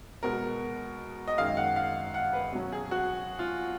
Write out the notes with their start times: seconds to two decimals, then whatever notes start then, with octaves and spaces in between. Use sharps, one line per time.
0.23 B2 G#3 B3 A#4
1.28 D#5
1.38 F#2 D#3 G#3 F5
1.57 F#5
1.76 F5
2.14 F#5
2.33 B4
2.53 B2 F#3 C#4
2.72 G#4
2.91 F#4
3.39 F4